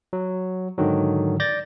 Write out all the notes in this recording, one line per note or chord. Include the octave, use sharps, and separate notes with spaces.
F#3
G#2 D3 D#3 F#3
D5 G6 A6 A#6